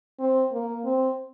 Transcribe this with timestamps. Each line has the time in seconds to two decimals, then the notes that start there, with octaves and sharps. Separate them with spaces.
0.20 C4
0.52 A#3
0.85 C4